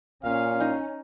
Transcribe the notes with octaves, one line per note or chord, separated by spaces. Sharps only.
A#2 C#4 F5
D#4